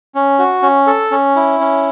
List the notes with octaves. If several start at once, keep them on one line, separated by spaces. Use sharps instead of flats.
C#4
F#4
C#4
A4
C#4
E4
C#4